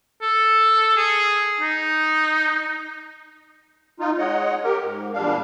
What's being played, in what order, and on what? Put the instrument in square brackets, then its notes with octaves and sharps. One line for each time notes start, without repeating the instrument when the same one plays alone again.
[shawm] A4
G#4
D#4
[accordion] D#4 F4
G#3 C#5 D#5 F#5
G4 A#4
G#2
E2 A#2 G3 D4 F5